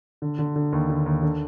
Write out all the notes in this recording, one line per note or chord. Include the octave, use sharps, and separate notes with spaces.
D3
D3
D3
D#2
D3
D#2
D3